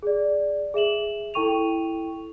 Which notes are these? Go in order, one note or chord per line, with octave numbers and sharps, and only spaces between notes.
G#4 D5
G#4 E5 E7 F#7
E4 A4 G5 C#6 D#7 F7